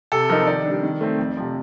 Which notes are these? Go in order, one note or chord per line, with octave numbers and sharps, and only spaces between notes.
C3 A4
F3 C4 D#4 A#4
D#3 D5
G3 D4
D#3
A3 C4
F2
C3 F3